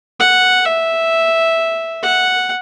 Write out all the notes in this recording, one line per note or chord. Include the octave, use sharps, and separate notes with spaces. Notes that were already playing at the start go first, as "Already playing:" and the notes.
F#5
E5
F#5